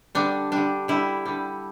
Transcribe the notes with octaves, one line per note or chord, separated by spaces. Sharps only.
D3 G3 D4
D3 G3 D4
D3 G3 E4
D3 G3